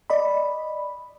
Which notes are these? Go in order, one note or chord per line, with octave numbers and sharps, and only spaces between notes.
D5 D#5 B5